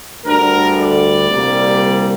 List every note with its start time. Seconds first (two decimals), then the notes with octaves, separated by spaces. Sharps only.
0.24 D2 D3 G3 A#4
0.77 D5
1.29 C2 A#2 G3